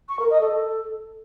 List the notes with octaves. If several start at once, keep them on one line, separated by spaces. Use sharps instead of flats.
C#6
A#4
D#5
A4